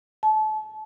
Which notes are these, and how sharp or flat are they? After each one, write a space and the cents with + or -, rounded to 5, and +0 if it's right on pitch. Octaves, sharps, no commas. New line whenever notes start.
A5 -30